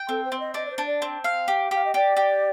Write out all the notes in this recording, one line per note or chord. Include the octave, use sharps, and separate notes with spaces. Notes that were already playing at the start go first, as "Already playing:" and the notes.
Already playing: G5
C4 A4
C5
C4
D#5
D4 D#5
D5
C5
D4
D5
C4
F5
G4
G4 F5
D#5
G4 D5
G4